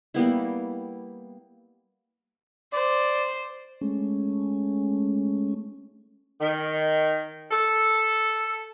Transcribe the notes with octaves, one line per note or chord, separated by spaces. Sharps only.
G3 A#3 B3 E4
C5 D5
G#3 A3 C#4
D#3
A4